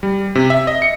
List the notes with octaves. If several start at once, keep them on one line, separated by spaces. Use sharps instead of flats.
G3
C3
E5
D#5
C#7